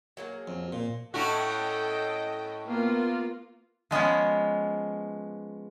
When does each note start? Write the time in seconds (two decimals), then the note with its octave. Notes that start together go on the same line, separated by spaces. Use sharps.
0.17 F#3 A#3 G#4
0.48 F2
0.73 A#2
1.14 A2 C#4 F#4 A4 D#5 G5
2.66 A#3 B3 F4
3.91 F3 G#3 B3 C#4